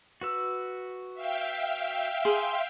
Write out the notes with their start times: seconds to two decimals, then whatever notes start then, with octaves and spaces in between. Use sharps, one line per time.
0.21 F#4 B4 E6
1.14 E5 F5 G5
2.25 G#4 C6